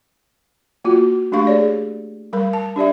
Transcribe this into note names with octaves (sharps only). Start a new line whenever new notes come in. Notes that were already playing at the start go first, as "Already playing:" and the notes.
A#3 F4 F#4
A3 D4 G4 F5 C#6
G#4 C#5 D5
G3 A#4 B5
A5
D4 G4 D5 E5